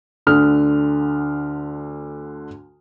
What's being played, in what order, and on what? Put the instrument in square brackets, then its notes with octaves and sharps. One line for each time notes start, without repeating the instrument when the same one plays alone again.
[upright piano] D2 D3 D#6 F6